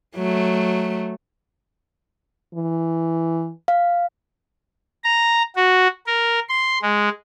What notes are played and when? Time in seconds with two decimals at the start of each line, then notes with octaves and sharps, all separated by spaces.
0.16 F#3 A3
2.54 E3
3.68 F5
5.04 A#5
5.56 F#4
6.07 A#4
6.49 C6
6.82 G#3